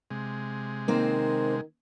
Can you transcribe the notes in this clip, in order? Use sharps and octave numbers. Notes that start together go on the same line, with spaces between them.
C3 G#3
D#3 A#3 C4 C5